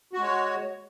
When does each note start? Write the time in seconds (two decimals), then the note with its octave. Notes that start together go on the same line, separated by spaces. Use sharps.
0.13 F#4
0.18 G#3
0.23 C#5